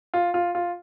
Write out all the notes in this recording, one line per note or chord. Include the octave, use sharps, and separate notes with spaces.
F4
F4
F4